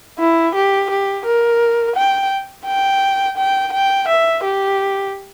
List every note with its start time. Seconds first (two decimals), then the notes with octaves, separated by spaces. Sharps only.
0.19 E4
0.55 G4
0.90 G4
1.25 A#4
1.96 G5
2.66 G5
3.37 G5
3.72 G5
4.08 E5
4.43 G4